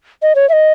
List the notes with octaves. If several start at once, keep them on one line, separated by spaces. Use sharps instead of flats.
D#5
C#5
E5
D#5